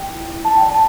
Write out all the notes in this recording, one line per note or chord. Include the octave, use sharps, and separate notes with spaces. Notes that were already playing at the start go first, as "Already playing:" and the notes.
Already playing: G5
E4
E4
E4 A5
G5
D5
A5